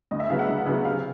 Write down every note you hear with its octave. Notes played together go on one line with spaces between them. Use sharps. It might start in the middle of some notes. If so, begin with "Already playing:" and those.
D2 D#5
E5
C#3 F#3 B3 F5
F#5
D2
C#3 F#3 B3
C3 F5